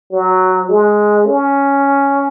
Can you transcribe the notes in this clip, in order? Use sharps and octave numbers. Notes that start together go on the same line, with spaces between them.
F#3
G#3
C#4